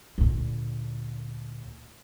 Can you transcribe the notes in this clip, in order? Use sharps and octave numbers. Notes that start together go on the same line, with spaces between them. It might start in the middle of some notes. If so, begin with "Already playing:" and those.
D2 A#2